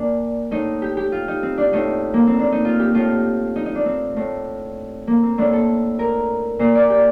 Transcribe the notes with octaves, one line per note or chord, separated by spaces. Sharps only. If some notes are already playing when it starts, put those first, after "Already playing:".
Already playing: A#2 D4
A2 D#4
G4
G4
F4
D#4
C4
D4
A2 D#4
A#3
C4
D4
D#4
F4
G4
A2 F4
D#4
D#4
D4
C4
A2
A#3
C4
A2 D4
A4
A#4
A#2 C5
D5
G4